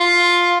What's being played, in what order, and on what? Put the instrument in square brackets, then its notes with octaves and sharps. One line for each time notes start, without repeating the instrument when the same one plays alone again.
[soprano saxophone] F4